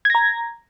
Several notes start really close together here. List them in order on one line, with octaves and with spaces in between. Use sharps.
G#6 A#6 A#5